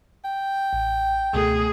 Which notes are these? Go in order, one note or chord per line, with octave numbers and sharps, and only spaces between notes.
G5
A1
C#2 B2 A3 G#4